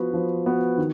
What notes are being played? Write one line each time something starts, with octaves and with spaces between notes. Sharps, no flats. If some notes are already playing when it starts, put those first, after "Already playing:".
Already playing: F3 B3 F#4 B4
F3
B3 F#4 B4
D#3